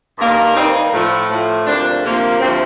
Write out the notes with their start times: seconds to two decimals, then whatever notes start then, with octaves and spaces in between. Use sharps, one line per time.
0.17 G2 D#3 G3 A#3
0.55 G2 D#3 G3 A#3 C4 D#4
0.92 A2 F3 A3
1.29 A2 F3 A3
1.66 D2 C3 F3 A#3 D4
2.03 D2 C3 F3 A#3
2.40 D2 C3 F3 A3 C4